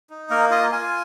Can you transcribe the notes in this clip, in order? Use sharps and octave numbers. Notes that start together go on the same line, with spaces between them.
D#4
A#3 A#4
F4 D#5
F4 G#5